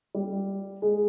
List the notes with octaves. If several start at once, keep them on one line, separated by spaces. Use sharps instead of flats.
G3
G#3